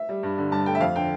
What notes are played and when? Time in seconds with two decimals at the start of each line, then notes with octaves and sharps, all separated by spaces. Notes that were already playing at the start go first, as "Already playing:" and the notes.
Already playing: E5
0.09 G3
0.23 G2
0.38 D3
0.52 G2 A5
0.66 A3 G5
0.75 E5
0.81 F2 F5
0.95 D3 G5